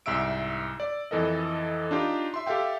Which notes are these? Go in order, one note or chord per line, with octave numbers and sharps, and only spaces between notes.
C2 G#2 E5 E6 D7
D5
F2 E3 A4 A#4 D#5
D4 D#4 F4 G4
E5 C6
G4 A4 E5 F5 G5